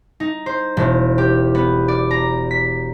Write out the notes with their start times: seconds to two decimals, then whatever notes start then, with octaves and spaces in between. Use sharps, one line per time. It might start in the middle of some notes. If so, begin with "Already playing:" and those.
0.20 D#4
0.46 C5
0.77 E1
1.18 G4
1.55 B3
1.88 D5
2.11 A#5
2.51 B6